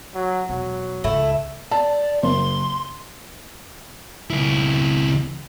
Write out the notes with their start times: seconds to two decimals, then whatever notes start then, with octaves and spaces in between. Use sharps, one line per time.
0.15 F#3
0.49 E1 F#3
1.04 C#2 G#2 A3 E4
1.71 D5 A5
2.23 F#1 C6
4.30 C#2 E4